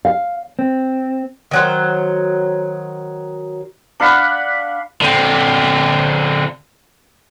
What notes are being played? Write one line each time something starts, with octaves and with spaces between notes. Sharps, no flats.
F5
C4
D#3 F#3 C5
D4 F5 F#5 B5
D3 C4